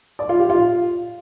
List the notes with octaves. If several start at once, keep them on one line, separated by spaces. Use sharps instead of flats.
D5
F4
G4
F4